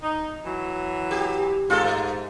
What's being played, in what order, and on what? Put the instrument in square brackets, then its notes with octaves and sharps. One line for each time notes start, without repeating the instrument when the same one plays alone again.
[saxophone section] D#4
E3 F#3
[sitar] G4
[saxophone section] G#2 [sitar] F4 A4
[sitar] A3